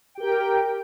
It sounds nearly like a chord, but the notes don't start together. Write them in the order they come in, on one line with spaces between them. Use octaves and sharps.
G5 G4 A#4